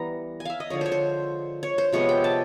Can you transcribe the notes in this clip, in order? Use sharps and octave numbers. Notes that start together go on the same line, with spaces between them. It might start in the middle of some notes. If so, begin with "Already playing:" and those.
Already playing: E3 G3 B3 A#5
G#5
E5 F5
D#5
D3 F3 G#3 C#5
C5 C#5
C5
C#5
C5
C3 F3 G#3 B3 C#5
G5
A5